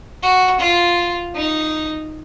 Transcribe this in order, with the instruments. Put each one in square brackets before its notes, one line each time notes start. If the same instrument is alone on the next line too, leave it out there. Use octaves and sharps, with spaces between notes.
[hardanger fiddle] F#4
F4
D#4